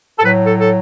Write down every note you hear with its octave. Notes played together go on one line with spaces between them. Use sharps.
A4
A2 F#3 B4
A4
A4